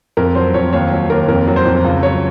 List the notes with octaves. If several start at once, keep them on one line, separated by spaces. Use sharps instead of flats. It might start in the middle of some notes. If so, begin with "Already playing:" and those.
F2 A#4
F#3 C5
F2 C#5
D#2 C#5
F#3
D#2 A#4
F2 A#4
F#3
C5
F2
C#2
F#3 C#5